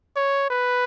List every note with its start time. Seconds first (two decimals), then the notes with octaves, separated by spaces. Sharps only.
0.16 C#5
0.50 B4